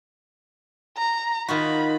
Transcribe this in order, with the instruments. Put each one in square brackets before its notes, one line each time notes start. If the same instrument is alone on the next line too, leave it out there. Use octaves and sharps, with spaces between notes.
[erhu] A#5
[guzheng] D#3 F4 F#4 [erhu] B5